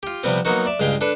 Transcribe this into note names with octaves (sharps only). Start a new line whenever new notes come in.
F4 G4
C3 F3 G3 B3 C4
F#3 A#3 B3 D#4 F#4
D5 E5
C#2 G2 G#3 F5 G5
D4 A4 B4